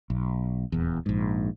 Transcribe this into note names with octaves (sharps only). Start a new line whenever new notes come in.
B1
D#1 E2
A#1 G#2